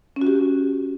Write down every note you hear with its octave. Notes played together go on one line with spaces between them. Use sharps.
C#4
F#4
G4